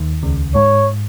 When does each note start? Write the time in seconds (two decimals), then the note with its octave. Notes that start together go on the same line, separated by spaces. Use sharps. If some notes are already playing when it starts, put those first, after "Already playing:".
Already playing: D#2 D#3
0.23 C#2 C#3
0.55 G#2 C#5